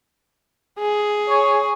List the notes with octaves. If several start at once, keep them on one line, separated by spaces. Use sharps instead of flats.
G#4
C#5